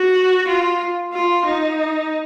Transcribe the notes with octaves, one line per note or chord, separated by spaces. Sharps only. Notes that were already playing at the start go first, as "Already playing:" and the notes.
Already playing: F#4
F4
F4
D#4